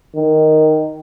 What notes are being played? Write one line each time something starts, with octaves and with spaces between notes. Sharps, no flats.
D#3